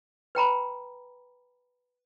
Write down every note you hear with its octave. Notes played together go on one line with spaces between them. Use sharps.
B4 G5 A#5 B5